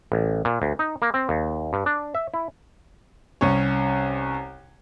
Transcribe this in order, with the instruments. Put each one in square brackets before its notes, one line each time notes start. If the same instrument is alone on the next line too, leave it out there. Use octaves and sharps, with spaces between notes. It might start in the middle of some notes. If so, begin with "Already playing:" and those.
[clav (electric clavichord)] A1
A#2
D2
D#4
A#3
C4
D#2
G2
D4
E5
E4
[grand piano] C2 C#4 C#5